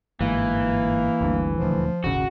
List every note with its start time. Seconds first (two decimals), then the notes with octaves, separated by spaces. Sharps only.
0.21 G1 G#2 E3 A#3
1.21 G1 D2 G2
1.58 D#1 D2 F3
2.04 D#1 G#1 C#3 F#4